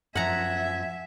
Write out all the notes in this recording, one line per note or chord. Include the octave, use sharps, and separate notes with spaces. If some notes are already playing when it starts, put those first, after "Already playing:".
F#2 F3 E5 F#5 G#5 A#5